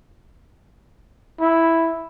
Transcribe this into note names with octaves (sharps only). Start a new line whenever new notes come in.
E4